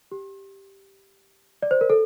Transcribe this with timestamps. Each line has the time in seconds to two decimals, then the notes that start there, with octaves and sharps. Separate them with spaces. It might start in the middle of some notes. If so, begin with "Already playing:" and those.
0.11 G4
1.63 D5
1.71 C5
1.81 A#4
1.90 A4